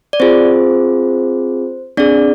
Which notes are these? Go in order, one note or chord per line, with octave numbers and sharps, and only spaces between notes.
D5
C4 F4 G#4 C5
C4 D4 G#4 D5